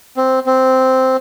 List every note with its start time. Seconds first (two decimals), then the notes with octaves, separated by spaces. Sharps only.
0.17 C4
0.46 C4